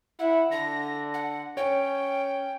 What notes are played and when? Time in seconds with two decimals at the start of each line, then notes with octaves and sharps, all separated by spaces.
0.19 E4 F#5
0.51 D3 A#6
1.14 F#5
1.57 C#4 C#5 G5